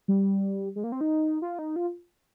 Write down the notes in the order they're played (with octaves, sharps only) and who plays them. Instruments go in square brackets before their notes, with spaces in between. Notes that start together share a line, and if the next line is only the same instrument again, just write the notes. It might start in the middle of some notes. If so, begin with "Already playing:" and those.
[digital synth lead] G3
G#3
A#3
C4
D#4
F4
D#4
F4